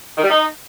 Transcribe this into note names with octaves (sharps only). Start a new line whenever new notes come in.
D#3
G3
D#4